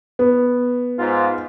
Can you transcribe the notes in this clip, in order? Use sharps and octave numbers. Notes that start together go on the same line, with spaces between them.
B3
G#2 F4